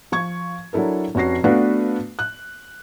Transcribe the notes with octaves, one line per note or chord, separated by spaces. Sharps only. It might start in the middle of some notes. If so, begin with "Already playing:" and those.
F3 C#6 G#6
F#3 D4 E4 A4 A#4
F1 C#4 F#4 A#6 C7
A3 B3 D4 F#4 B4 F5
F#6